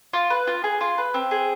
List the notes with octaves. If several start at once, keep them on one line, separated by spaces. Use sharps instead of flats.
F4
B4
F4
G#4
F4
B4
C4
G#4